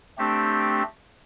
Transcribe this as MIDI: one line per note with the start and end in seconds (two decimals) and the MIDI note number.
0.18 0.83 57
0.18 0.83 60
0.18 0.83 62
0.18 0.83 67